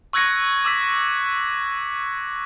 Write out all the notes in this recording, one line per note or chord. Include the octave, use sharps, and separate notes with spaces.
C#6 E6 F#6 G#6 A#6 C#7
D6 E6 B6